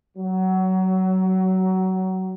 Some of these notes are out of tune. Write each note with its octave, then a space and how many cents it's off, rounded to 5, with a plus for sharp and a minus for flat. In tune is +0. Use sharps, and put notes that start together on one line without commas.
F#3 +20